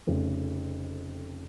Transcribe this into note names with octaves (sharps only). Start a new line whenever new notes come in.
F1 F2 C#3